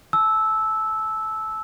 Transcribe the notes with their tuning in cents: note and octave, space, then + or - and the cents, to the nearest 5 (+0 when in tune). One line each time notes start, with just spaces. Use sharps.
A5 -25 E6 -10